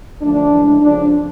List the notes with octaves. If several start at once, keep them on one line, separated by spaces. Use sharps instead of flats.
F#2 D3 F3 A3 D4
C#3 E3 G#3
F2 C#3 F3 D4